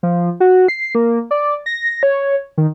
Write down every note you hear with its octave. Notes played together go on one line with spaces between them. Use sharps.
F3
F#4
C7
A#3
D5
A#6
C#5
D#3